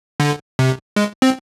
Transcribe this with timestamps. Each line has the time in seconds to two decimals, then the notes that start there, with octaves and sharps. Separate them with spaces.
0.20 D3
0.59 C3
0.96 G#3
1.22 C4